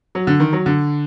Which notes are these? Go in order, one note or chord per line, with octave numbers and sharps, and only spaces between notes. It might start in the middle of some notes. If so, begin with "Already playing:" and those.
F#3
D3
D#3
F#3
D3